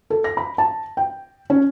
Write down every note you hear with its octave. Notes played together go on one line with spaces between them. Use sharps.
A4
A#6
B5
A5
G5
C#4